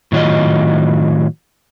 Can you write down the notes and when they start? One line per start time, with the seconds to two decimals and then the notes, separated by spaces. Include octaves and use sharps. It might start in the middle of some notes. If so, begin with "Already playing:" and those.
0.12 A2 D#3 F#3 F4 D#5